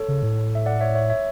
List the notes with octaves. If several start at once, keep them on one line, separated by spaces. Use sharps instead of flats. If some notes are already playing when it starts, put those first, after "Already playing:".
Already playing: A4 C#5
C#3
A2
E5
D5 F#5
C#5 E5
C#5 E5
C#5 E5